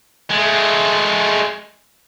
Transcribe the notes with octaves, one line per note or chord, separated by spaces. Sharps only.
G#3 A3